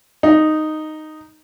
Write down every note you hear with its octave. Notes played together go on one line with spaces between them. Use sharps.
D#4